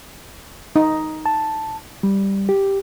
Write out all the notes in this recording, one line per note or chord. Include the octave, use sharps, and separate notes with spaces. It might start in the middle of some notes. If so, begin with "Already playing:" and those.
D#4
A5
G3
G4